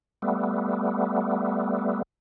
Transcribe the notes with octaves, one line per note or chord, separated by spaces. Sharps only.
G3 A3 B3